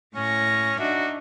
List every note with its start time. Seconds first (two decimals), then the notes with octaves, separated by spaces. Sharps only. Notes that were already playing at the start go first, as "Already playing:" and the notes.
0.15 A2 C#4 C#6 A#6
0.79 D4 D#4 F#4 E5